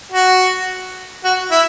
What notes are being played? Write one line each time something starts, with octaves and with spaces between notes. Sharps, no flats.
F#4
F#4
E4